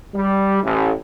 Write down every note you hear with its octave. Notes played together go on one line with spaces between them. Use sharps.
G3
A1